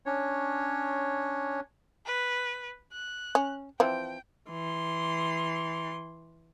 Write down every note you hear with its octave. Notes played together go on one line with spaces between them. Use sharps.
C#4 D4 C#5
B4
F#6
C#4
E3 F3 C4 G5
E3 C6